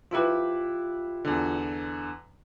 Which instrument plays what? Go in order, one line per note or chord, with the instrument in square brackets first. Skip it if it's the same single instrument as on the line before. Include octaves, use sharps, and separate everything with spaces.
[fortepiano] F3 E4 B4 [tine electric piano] F4 G4
[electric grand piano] E2 D3